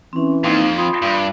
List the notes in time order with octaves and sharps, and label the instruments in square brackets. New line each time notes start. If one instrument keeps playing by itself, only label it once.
[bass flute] E3 [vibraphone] C4 C#4
[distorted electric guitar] F2 [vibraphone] A#3 C4 D#4
[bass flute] F4 [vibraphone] B5 C6 D#6
[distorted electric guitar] G2